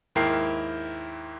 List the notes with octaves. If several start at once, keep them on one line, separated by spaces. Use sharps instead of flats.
D#2 G#2 E4 A#4 G5 C7